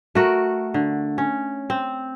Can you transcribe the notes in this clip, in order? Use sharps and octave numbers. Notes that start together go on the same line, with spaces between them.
A3 F#4 A#4
D3
C#4
C4